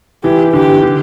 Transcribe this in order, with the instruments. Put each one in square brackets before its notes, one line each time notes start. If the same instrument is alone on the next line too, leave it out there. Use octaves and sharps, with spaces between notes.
[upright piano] E3 [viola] G4
[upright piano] D3 [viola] G4
[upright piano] D3